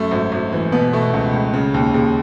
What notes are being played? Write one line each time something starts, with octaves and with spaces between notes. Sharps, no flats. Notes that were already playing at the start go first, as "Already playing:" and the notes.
Already playing: F#2 A3
G#1
G#1
E3
B2 B3
B2 A3
C#2
C#2
C#3
D#2
D#2 G#3